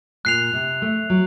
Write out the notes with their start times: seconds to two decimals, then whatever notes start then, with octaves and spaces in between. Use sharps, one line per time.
0.25 A#2 F#6 C7 F7
0.53 C3
0.82 A3
1.10 F#3